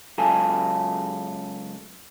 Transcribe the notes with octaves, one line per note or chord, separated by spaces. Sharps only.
C#2 F#3 F4 A4 G#5